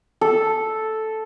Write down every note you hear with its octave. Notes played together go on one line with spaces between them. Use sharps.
A4